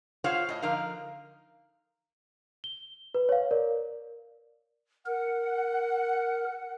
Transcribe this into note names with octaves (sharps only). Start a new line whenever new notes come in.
F4 G#4 C5 C#5 F5 F#5
A2 D#5
D3 F3 D#4 A#4 F5
G7
B4
C#5 F5
A#4 D5
A#4 F#5